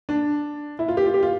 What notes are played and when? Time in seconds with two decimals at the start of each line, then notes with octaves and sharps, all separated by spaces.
0.09 D4
0.79 E4
0.88 F4
0.97 G4
1.06 F4
1.14 G4
1.23 F4